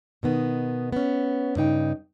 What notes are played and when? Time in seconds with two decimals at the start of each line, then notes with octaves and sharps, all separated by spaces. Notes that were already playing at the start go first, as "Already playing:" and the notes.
0.23 B2 D#3 B3
0.92 B3 C#4
1.56 G2 C#3 D#4 G5